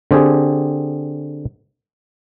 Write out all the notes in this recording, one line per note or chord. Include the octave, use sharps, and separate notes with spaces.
D3 C4 G4 G#4